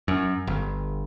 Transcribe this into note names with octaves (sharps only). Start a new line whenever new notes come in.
F#2
G1